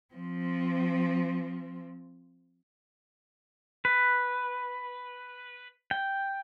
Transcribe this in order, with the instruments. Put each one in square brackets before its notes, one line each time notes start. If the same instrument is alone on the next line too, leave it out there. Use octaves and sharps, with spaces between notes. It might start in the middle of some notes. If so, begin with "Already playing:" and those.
[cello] F3 C4
[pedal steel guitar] B4
G5